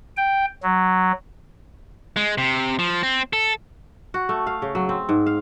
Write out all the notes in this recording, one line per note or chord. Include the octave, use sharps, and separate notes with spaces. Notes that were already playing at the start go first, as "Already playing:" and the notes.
G5
F#3
G#3
C3
F3
C4
A4
F#4
A3
F5
C#3
F#3
C4
G#2
F5